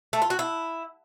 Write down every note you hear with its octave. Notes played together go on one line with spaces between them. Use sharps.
A3
F4
F#4
E4